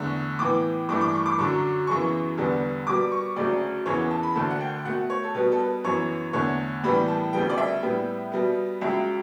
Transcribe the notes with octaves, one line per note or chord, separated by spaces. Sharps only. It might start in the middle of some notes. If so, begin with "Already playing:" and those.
Already playing: E2 D3 A3 C#6
A2 E3 B3 D6
G2 E3 A3 D6
D6
C#6
D6
F#2 D3 F#3 C#6
F#2 C#3 E3 B3 C#6
E2 D3 G3 B3
B2 G3 B3 D6
C#6
D2 C#3 F#3 A3 D5
E2 C#3 E3 C#5
B4
A5
B5
D2 D3 A3 A5
F#5
G5
B2 A3 F#5
C#5
A4
B2 G3 B3 B4
A4
B4
F#2 E3 B3 C#5
E2 D3 A3 C#5
A2 E3 G3 B3 B5
A5
D2 C#3 G3 B3 G5
D5
E5
A2 G3 B3
B2 G3 B3
C#2 C#3 F#3 E5